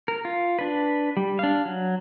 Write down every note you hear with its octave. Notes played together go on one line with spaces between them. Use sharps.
A#4
F4
D4 B4
G3
D4 F5
F#3